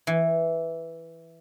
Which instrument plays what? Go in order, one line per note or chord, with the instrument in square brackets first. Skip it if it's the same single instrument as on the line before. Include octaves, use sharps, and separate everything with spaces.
[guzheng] E3